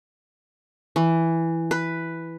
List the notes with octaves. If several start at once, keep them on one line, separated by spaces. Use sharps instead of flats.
E3
B4